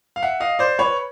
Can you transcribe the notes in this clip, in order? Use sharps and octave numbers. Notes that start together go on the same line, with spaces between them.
F5
E5 F#5
D#5 F5
C5 D5
B4 C#5